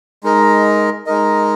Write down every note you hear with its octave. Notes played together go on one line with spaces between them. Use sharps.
G#3 D#4 A#4 D#5
G#3 D#4 A#4 D#5